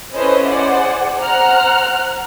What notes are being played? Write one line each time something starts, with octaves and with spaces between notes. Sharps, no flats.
C#4 E4 A4 B4 C5 D#5
G#4 C5 D5 F#5
C5 F#5 A#5 F6 F#6